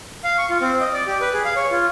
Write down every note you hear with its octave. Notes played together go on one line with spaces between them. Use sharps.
F5
C#6
F4
C4
D#5
D5
G4
B4
G#4
F5
C#5
F4